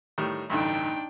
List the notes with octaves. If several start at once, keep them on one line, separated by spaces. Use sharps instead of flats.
A2 D#3 G3
A1 D2 G2 D4 D#4 G5